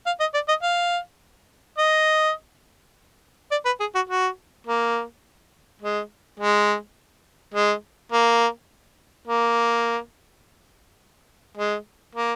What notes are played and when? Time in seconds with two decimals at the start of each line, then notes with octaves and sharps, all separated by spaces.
0.06 F5
0.20 D#5
0.34 D5
0.49 D#5
0.63 F5
1.78 D#5
3.51 D5
3.66 B4
3.80 G#4
3.95 F#4
4.10 F#4
4.67 A#3
5.82 G#3
6.40 G#3
7.54 G#3
8.12 A#3
9.28 A#3
11.58 G#3
12.15 A#3